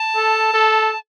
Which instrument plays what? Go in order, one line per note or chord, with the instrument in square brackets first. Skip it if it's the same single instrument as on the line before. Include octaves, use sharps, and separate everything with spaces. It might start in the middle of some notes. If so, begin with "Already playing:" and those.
Already playing: [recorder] A5
[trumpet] A4
A4